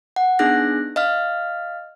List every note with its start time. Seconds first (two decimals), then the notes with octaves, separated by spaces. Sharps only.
0.16 F#5
0.39 B3 D4 D#4 G#4 F#6 A#6
0.96 D#5 F5 F6